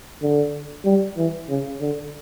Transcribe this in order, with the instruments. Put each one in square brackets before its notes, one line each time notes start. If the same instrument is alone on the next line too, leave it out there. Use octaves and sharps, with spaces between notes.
[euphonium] D3
G3
E3
C#3
D3